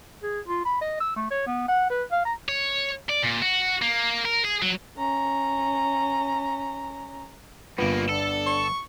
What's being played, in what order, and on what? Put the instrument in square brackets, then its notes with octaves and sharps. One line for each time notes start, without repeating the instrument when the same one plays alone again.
[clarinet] G#4
F4
B5
D#5
E6
A3
C#5
B3
F#5
B4
F5
A#5
[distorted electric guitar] C#5
D5
A#2
F#4
A#3
A#4
G#4
F#3
[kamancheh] C#4 A#5
[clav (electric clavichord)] G1 B3 [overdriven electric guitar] G2 A#3 [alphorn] F4
[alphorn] D4 [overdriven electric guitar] A4
[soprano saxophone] C#6